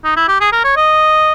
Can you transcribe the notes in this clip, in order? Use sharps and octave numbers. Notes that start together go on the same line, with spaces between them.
D#4
E4
G4
G#4
A#4
C#5
D#5